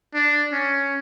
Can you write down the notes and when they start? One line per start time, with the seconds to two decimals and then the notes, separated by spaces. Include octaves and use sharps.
0.15 D4
0.52 C#4